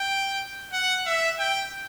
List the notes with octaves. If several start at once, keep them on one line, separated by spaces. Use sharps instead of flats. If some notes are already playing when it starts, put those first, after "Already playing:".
Already playing: G5
F#5
E5
G5